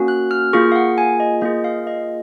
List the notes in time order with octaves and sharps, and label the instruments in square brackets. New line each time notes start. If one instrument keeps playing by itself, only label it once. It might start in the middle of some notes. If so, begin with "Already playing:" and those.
Already playing: [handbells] A#3 C#4 F#4
F#6
F6
A#3 F4 G#4 C#6
F5
F#5
G#5
D#5
A#3 F4 G#4 D#5
F5
D#5